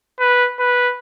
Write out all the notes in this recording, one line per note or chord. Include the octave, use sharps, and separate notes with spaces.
B4
B4